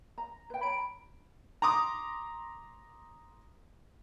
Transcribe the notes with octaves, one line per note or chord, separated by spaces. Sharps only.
A#5
B4 G5
C#5 A#5 B5 D7
A#5 C6 D6 D#6